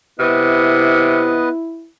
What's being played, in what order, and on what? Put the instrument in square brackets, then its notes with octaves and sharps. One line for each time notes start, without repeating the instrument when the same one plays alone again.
[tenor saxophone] C3 [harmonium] B3 B4 D#5 [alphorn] E4